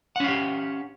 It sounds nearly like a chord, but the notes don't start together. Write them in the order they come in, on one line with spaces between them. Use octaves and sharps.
F#5 C#4 F5 G4